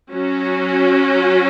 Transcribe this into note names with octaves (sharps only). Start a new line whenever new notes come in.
F#3 C#4 F#4